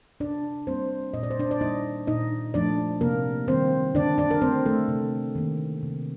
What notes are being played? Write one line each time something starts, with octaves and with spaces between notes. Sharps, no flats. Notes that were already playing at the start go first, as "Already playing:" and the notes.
C3 D4 D5
G3 A#3 C4 C5
A#2 D#5
D5
C5
D4 D5
D5
G3 A#3 D#4 D#5
A#2 D#4 D#5
F3 A3 D4 D5
C3 A#3 A#4
D#3 G3 C4 C5
D3 D4 D5
D4 D5
A#4
A3 C4 C5
A3 A4
C3
D#3 A#3
C3